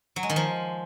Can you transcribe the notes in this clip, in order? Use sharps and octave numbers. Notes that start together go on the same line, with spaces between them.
F#3
G#3
D#3
F3